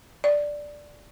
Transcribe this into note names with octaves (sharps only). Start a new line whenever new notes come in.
D5